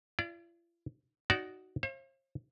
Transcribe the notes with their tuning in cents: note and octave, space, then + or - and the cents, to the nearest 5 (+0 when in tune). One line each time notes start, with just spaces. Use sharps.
F4 -45 D5 +0
D#4 +0 F#4 +10 D5 -25
C5 +45 F5 -40